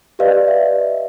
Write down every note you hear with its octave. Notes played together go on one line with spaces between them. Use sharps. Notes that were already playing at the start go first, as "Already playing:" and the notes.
G4 B4 D5 D#5 F5
E5